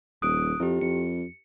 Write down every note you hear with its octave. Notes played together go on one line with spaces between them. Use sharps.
D#1 D#6 F#6 D7
F2 E4 G4
F2 C#7